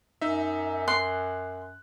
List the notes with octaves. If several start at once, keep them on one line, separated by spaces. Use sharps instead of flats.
F#2 D#4 E5
C6 F#6